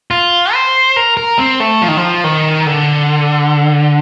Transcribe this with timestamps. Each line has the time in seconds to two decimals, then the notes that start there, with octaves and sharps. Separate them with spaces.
0.11 F4
0.53 C5
0.96 A#4
1.17 A#4
1.39 C4
1.60 A3
1.82 F3
1.88 D#3
1.97 F3
2.24 D#3
2.67 D3